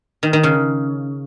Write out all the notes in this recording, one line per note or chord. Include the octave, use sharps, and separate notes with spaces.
D#3
D#3
C#3